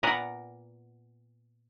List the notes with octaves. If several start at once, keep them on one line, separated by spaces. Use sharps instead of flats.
A#2 B3 A#4 D5 F#5